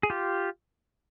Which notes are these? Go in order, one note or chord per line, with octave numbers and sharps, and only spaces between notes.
G#4
F4 G4